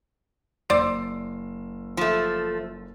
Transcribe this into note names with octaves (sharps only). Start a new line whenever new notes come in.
F#1 C5 D5 E6 C7
F3 A3